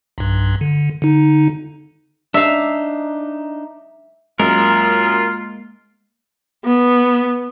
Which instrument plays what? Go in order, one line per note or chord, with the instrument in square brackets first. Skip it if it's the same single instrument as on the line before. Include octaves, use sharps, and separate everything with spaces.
[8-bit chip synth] B1 G2
D3
D3 D#4
[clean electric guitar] D4 D#4 [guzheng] E5 F5
[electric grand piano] F#2 [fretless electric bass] G#3 A#3 [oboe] F4 [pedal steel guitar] A#4
[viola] B3